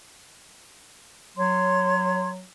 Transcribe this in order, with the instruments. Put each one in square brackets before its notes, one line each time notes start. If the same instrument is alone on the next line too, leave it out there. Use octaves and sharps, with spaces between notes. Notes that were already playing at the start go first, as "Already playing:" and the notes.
[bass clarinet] F#3 [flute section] C#5 C6